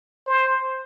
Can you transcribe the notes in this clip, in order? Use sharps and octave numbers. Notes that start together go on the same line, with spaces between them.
C5